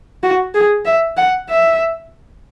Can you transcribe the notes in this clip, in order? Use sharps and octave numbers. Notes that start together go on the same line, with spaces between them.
F#4
G#4
E5
F#5
E5